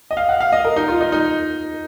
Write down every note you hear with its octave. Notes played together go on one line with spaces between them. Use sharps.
D#5
F5
F#5
F5
D#5
A#4
D#4
F4
D#4
D#4